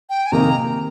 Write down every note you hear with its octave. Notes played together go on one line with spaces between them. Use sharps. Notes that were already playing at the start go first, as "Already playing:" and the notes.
G5
G#5
C3 D#3 A#3 D#4 A#5